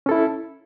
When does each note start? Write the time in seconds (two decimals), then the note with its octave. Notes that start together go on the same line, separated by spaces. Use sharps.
0.06 C#4
0.09 A4
0.11 E4